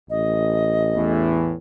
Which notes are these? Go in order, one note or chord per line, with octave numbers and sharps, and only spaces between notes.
A1 D#5
E2 A2 E3